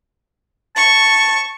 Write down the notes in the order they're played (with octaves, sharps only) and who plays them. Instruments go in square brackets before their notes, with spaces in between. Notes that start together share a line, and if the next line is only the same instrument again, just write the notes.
[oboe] A5 [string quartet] C#6